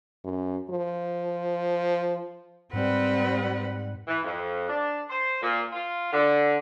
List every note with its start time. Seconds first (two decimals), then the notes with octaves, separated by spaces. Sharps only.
0.24 F#2
0.70 F3
2.73 G#2 G3 C4 B4 F#5
4.08 E3
4.23 F2
4.68 D4
5.09 C5
5.42 A#2
5.73 F4
6.12 D3